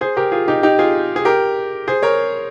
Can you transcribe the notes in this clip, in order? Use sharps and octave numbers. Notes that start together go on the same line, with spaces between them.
G#4 C5
G4 A#4
F4 G#4
D#4 G4
D#4 G4
F4 G#4
G#4
G4 A#4
G#4 C5
A#4 C#5